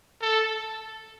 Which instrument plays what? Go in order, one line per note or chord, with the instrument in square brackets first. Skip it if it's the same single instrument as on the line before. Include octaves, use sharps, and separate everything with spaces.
[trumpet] A4